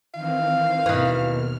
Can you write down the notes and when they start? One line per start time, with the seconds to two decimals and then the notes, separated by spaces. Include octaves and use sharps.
0.14 D#3 E3 C4 F5
0.86 D#2 B2 D#3 E3 F6